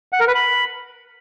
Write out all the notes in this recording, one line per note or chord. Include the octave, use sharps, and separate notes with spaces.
F#5
A#4
B4
B5